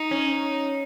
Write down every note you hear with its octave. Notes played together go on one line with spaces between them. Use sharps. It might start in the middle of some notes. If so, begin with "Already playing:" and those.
Already playing: D#4
C#4